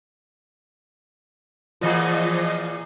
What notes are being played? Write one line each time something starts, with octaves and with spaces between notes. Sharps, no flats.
A#2 E3 F3 G#4 D#5